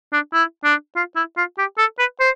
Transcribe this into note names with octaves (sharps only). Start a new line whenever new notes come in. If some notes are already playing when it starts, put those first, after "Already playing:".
D4
E4
D4
F4
E4
F4
G4
A4
B4
C5